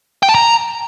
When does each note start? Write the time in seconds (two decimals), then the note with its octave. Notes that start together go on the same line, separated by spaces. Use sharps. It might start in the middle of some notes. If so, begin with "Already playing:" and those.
0.23 G5
0.29 A5
0.35 A#5